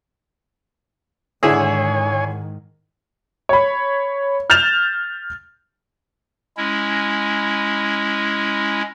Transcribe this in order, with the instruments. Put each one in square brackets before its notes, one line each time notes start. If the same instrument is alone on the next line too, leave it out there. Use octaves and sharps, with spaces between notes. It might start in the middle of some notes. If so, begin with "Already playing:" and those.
[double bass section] G#2 D#3 [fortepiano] D3 E4 G#4 [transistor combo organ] C#5 G#5
[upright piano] C#5 B5
F6 G6 A6 E7 F7
[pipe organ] G#3 C#4 E4